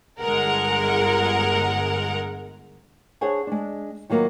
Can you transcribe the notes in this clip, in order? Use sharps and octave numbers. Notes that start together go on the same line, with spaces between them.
G1 G#3 A#4 F#5
D4 G#4 C5 C#5 F#5 G#5
G#3 D4
D#3 F#3 A#3 B3 F4